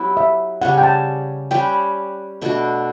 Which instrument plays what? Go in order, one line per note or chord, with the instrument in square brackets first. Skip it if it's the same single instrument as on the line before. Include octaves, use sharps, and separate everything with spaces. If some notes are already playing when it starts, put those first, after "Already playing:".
Already playing: [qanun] F#3 B3 E4 G4
[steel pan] E5
[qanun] C#3 G3 C#4 [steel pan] F#5
[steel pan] G5
A5
[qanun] G3 C#4 G4 B4 [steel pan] G5
[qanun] B2 A3 D4 F#4